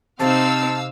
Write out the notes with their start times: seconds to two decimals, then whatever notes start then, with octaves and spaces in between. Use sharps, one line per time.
0.20 C3 C4 D#4 F5 A5 E6